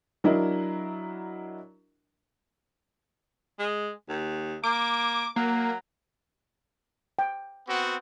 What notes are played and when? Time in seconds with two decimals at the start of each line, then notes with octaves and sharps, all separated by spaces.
0.24 F#3 D4 E4 A#4 D#5
3.59 G#3
4.09 D#2
4.64 A#3 D6
5.36 F#3 A#3
7.19 G5
7.68 B3 C4 F#4